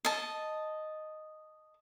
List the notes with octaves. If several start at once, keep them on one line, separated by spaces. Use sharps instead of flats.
D#5 A5